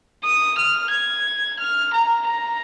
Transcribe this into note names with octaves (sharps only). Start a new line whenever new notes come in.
D#6
F6
G#6
F6
A#5
A#5